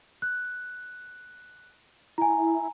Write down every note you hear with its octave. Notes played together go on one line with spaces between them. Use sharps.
F#6
E4 G#5 A#5